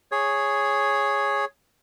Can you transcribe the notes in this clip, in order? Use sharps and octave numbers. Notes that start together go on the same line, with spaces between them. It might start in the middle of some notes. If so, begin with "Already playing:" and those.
G#4 C#5